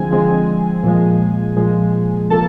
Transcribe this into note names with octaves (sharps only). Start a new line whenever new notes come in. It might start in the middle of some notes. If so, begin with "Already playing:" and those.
Already playing: D3 F3 G#3 C4 G#4 G#5
D3 F3 G#3 C4
A#2 F3 G#3
A#2 F3 G#3
C3 F3 A#3 A4 A5